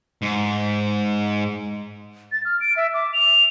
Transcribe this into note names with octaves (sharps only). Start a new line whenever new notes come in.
G#2
A6
F6
D7
E5
D6
F7